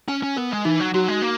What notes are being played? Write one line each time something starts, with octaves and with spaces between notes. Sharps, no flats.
C#4 G#5
C#4
B3 A#4
G#3
E3 D#4
F#3
F#3 F#4
G#3
A#3